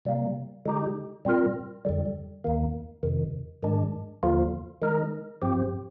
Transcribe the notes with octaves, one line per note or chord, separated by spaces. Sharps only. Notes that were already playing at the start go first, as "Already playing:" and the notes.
C3 G3 A#3
D3 G#3 D#4 G4
A#2 G3 C4 F4 A#4
F2 D3 G3
D#2 D#3 A#3
F2 C3 D#3
G#2 D#3 G#3 D4
D#2 D3 F3 A#3 F4
D#3 G#3 D#4 A#4
G2 F3 C4 G4